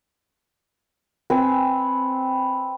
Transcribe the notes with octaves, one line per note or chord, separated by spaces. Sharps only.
C4 B4 G#5 B5